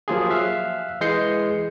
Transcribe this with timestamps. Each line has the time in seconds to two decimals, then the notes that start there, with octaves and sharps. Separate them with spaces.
0.08 F3 F#3 A#3 F4 G4 G#4
0.30 E5 F5 F#6
1.01 E3 G#3 D#5 G6 C7 C#7